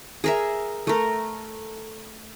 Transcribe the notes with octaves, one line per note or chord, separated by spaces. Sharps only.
G#4 A#4 E5
A3 A#4